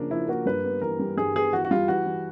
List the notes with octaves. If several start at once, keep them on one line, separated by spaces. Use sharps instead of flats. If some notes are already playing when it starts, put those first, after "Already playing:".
Already playing: C#3 F3 A#3 D4
F3 E4
A#3 F#4
G2 B4
B3
E3 A#4
G3
G2 G#4
B3 G#4
E3 F#4
F#4
G3 F4
E3 F#4
E3